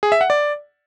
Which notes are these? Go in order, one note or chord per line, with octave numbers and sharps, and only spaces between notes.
G#4
E5
F#5
D5